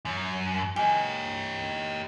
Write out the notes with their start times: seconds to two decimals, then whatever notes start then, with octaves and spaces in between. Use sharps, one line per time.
0.05 F#2
0.76 G4 D#5 G#5